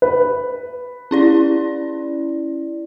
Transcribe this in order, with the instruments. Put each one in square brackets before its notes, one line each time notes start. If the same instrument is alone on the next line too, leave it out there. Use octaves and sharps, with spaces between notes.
[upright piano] B4
[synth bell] C#4 E4 D5